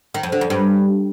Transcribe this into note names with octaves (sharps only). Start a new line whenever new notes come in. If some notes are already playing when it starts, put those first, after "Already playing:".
D#3
F2
D3
F2
G2